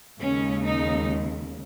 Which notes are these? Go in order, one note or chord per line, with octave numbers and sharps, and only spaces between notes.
D#2 C#3 G#3 C#4
D#4